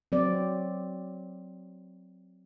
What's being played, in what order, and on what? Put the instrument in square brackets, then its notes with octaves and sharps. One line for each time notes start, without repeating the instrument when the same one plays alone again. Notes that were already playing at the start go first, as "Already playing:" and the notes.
[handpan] F#3 C4 D5